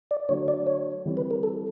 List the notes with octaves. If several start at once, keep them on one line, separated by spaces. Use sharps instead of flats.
D5
D3 F#3 A3 C#5
D5
C#5
E3 G3 C4 E4
B4
A#4
A4